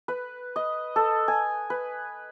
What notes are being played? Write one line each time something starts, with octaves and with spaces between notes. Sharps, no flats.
B4
D#5
A4
G#5
B4